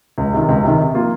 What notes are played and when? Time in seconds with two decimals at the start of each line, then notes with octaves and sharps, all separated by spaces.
0.18 C#2
0.33 C3 D#3
0.49 C#2
0.63 C3 D#3
0.79 C3
0.94 F3 A#3 F4